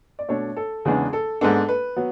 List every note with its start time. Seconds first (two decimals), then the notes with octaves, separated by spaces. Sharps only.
0.19 D5
0.29 B2 A3 D4 C#5
0.56 A4
0.85 E2 C#3 G#3 B3 D4 G#4
1.13 A4
1.41 G#2 G#3 B3 D4 A4
1.69 B4
1.96 F#3 B3